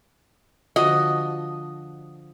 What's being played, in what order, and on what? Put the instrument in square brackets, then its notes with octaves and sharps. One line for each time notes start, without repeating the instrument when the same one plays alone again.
[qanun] D3 F3 F#4 [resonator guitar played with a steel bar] D#5